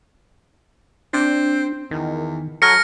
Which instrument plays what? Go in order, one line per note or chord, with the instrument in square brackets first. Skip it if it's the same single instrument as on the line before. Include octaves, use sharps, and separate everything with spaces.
[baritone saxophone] C4 [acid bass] D4
[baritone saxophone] E2 [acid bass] D#3
[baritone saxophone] F#3 [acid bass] A4 [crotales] F6 A#6 C#7